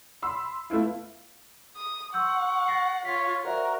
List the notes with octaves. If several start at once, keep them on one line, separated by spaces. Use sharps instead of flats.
B5 C6 E6
A3 B3 E4 F4
D#6
F#5 C6 C#6 E6 G6
A6 A#6 C7
F4 C#5 B6
F#4 A#4 C5 D5 E5